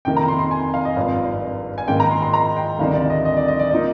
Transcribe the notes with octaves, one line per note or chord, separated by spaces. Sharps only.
F2 C3 D#3 A#3 G5
A#5
C6
C6
G#5
F5
D#5
G#1 G2 F3 F5
G#5
G#2 D#3 A#3 G5
A#5
C6
C6
A#5
G5
D2 C3 D#3 G3 D4 F5
D5
D#5
D#5
D5
D#5
D5
F3 A#3 D#4 D#5